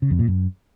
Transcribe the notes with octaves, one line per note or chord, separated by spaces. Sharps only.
C#3
F2
A#2
F#2